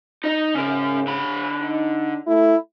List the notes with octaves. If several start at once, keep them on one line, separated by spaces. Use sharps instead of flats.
D#4 D#5
G#2 C#3 C#4 A#4
D3 B5
D#4
A3 E4